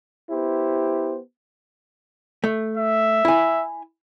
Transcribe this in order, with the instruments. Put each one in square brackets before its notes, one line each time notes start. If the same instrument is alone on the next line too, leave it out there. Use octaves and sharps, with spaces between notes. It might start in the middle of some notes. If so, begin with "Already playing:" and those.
[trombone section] B3 E4 G4 C5
[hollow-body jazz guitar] A3
[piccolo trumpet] E5
[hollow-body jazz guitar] E4 G#5